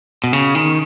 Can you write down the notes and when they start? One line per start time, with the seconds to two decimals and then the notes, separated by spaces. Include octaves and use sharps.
0.24 B2
0.33 C#3
0.55 D#3